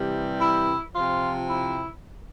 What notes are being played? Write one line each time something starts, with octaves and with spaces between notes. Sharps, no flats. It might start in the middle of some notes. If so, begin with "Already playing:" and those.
Already playing: C3 E3 G3
E4
C3 F3 F4
E4